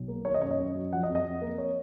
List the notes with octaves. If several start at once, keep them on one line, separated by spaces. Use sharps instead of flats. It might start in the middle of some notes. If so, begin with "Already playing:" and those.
Already playing: B1
A#3
D#3 C#5
D#5
F#2 C#5
D#5
F#2
F#3
F3 F#5
D#5
F2
D#5
F2
A#3
C#5